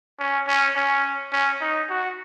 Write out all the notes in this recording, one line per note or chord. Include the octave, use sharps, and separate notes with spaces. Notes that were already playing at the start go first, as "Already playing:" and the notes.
C#4
C#4
C#4
C#4
D#4
F#4